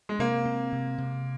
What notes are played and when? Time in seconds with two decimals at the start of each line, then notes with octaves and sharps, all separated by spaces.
0.09 G#3
0.19 C3 A#3
0.46 C4
0.73 C3
0.98 C3